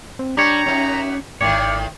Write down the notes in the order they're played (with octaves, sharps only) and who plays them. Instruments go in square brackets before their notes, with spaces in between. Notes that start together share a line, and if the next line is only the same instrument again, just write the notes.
[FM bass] C4
[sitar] G3 [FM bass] D4 [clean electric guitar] G4 C#5 [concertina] A#5
[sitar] F#2 D#4 [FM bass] C#4
[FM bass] G#1 [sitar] A2 D#3 [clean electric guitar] C#5 [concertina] D5